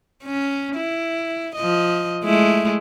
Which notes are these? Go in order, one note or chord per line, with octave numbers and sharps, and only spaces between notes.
C#4
E4
F3 D#5
G#3 A3 E4